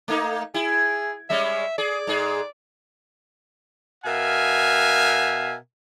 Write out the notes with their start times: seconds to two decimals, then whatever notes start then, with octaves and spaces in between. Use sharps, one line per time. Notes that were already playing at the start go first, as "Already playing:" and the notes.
0.08 A3 A#3 D#4
0.54 E4 G#4
1.30 G3 G#3 C#4 E5
1.78 G#4 D5
2.07 G#2 G#4
4.05 B2 A#4 E5 F5 G#5